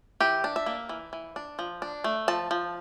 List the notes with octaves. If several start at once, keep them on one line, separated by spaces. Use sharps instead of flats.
E3 G4
D4
E5
A#3
E3
E3
D4
F3
D4
A3
F3 A5
F3